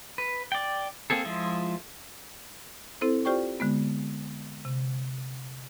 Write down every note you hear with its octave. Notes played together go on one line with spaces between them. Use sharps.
B4
D5 G5
A#3 C4 G#4 A4
F3 G#3 E4 F4 E5
C4 E4 A4 C5
F4 G4 C5 D5 G5 C#6
D3 G#3 B3
C3